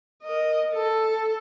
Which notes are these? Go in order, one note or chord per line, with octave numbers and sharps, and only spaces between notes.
A#4 D#5
A4